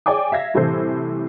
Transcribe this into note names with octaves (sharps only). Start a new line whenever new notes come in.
G#4 C#5 D5 G5 G#5 D6
E5 F5 G#6 A#6
C2 A2 C3 E3 A4 C5